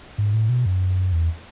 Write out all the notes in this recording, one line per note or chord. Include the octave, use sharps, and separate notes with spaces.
G#2
A2
B2
F#2
E2